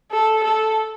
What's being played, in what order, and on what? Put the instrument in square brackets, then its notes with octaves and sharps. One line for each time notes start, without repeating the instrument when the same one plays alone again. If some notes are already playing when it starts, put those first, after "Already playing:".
[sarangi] A4
A4